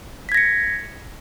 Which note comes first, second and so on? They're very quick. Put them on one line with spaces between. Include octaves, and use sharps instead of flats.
B6 G#6 A#6 C#7